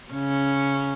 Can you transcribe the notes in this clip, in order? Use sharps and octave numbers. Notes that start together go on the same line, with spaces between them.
C#3 C#4